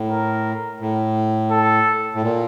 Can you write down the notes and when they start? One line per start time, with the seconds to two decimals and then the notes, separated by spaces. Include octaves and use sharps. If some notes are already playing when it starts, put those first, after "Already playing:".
Already playing: A2
0.09 A#4
0.80 A2
1.51 A4
2.14 A2
2.22 A#2